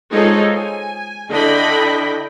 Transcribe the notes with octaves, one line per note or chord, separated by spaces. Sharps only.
G#3 D#4 F4 A4 C5 C#5
G#5
D3 D4 E4 D#5 G5 B5